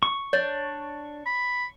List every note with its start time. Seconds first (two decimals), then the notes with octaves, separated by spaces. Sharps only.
0.03 C#6
0.33 D4 C#5
1.26 B5